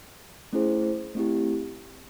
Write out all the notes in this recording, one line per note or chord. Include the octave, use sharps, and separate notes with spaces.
A3 C#4 E4 G#4 C5
A3 C4 E4 G4